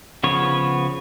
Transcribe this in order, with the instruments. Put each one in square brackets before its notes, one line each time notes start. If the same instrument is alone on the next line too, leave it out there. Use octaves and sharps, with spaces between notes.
[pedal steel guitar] C#3 F3 B3 C#5